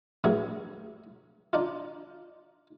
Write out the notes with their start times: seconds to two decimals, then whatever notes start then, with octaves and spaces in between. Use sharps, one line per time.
0.24 A1 G2 F#3 E4 G#4
1.53 D4 D#4 F4